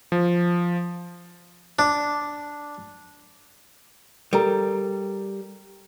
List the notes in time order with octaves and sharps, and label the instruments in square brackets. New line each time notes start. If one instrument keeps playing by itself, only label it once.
[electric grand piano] F3
[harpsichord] D4
[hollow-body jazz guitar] G3 [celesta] A4 A#4 A#5